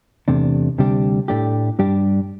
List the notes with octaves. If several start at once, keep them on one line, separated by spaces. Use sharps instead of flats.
E2 C3 A3 D4
D2 C3 G3 D4 G4
A2 A3 D4 G4
G2 G3 D4 G4